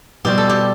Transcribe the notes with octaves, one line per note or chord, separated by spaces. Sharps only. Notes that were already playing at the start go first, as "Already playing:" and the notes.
B2 G3 C4 G4
A4
G4